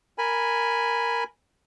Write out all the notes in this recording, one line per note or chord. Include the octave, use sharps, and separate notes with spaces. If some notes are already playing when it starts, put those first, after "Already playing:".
A#4 G#5 B5